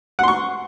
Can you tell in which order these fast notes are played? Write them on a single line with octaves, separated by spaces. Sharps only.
F#5 C6 C#6